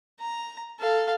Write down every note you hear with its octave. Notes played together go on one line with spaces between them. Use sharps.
A#5
A4 F5